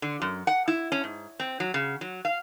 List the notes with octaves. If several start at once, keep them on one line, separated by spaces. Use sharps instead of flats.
D3
F#2
F#5
E4
C#4
G#2
C4
F#3
C#3
F#3
F5